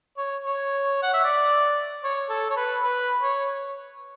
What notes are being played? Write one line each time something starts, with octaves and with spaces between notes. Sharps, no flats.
C#5
C#5
F#5
E5
D5
C#5
A4
C#5
B4
B4
C#5